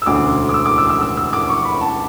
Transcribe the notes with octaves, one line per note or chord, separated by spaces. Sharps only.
E6
E1 D2 C#3 D6
D6
E6
D6
E6
E6
E6
E6
D6
C#6
B5
A5